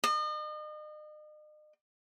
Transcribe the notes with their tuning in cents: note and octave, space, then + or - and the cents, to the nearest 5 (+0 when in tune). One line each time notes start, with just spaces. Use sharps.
D#5 -40